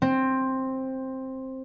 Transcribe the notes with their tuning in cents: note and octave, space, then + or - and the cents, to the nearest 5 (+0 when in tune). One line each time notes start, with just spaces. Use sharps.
C4 +10